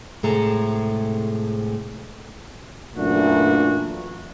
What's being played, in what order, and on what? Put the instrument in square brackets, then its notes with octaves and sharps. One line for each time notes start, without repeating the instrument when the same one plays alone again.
[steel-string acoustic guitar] A2 C3 G#3 G#4 A4 A#5
[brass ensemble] F#2 A#2 E3 A3 D4 F#4